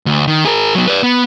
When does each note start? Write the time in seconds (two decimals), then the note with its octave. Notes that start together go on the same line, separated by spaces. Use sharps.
0.06 D2
0.27 D#3
0.45 G#4 A#4
0.75 F#3 B3
0.87 B4 D5
1.03 B3